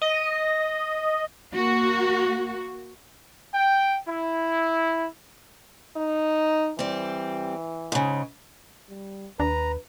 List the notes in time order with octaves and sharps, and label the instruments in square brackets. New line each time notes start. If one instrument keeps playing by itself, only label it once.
[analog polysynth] D#5
[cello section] A#3 F#4
[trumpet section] G5
E4
[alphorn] D#4
[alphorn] E3 [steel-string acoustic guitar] G3 C4
[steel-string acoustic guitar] G#2 C#3
[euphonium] G3
[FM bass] D#2 [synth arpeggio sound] D4 [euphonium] B4 [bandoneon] A#5